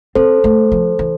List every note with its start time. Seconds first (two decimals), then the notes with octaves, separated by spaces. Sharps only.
0.15 C4 A4 C5
0.44 A3
0.72 F3
0.99 E3